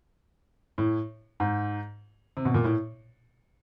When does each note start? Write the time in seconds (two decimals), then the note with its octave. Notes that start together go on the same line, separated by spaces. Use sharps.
0.78 A2
1.40 G#2
2.37 C3
2.45 B2
2.54 A#2
2.64 A2